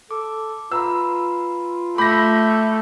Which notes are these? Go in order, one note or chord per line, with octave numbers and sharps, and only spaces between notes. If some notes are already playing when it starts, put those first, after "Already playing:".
A4 D6
F4 B4 A#5 B5 E6
A3 B5 D6 G6 A#6 B6